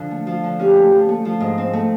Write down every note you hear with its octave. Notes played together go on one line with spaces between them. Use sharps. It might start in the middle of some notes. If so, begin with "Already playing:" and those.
Already playing: D3 F3
A3
F3
D3
C#4 G4
A3
F3
A3
F3
G#2
C4
A3